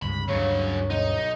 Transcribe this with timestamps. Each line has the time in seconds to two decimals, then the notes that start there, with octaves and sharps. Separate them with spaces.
0.02 C#2 G2 C3 B5
0.28 D2 G2 C#3 F#3 D4 C#5
0.90 B1 D#4 D#7